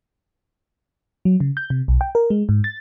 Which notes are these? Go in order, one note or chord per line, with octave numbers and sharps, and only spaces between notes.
F#3
C#3
G6
C3
B1
G5
A#4
G#3
G#2
A6